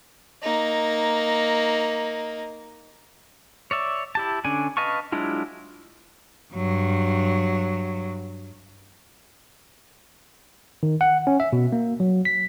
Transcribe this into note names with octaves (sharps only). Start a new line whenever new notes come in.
A#3 D#4
C#5 D5 E5
E4 G4 A5
D3 C#4 D4 G#5
B4 D#5 F5 A5 C#6
F#3 G#3 D4 E4 F4
G2 F#3
D#3
F#5
C#4
E5
B2
A#3
F#3
B6